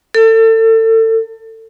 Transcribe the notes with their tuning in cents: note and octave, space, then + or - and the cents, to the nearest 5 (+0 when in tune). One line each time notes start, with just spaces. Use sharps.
A4 +30